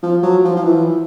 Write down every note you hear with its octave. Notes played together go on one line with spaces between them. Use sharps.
F3
F#3
F3
F3
E3